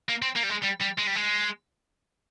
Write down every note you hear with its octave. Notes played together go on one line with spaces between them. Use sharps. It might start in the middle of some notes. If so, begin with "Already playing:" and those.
A#3
C4
A#3
G3
G#3
G3
G3
G#3
G3
G#3